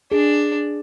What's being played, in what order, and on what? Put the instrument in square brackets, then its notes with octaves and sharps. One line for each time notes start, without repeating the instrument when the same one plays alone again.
[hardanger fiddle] D4 [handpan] G#4